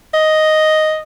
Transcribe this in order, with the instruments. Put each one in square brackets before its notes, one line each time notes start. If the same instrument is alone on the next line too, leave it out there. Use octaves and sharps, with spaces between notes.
[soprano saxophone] D#5